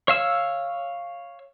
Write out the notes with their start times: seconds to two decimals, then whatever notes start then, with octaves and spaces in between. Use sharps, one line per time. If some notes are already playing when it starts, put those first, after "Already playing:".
0.08 C#5 F5 E6